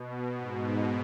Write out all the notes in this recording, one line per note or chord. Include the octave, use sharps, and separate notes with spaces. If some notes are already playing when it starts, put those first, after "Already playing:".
Already playing: B2
G#2
B2